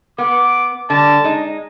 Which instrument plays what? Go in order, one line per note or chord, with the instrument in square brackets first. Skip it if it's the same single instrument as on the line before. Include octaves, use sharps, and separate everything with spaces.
[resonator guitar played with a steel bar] B3 [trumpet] D6
[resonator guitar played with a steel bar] D3 G3 [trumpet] A5
[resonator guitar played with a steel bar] G#3 D#4